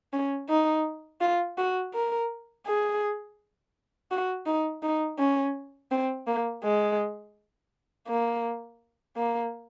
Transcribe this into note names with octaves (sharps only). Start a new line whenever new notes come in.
C#4
D#4
F4
F#4
A#4
G#4
F#4
D#4
D#4
C#4
C4
A#3
G#3
A#3
A#3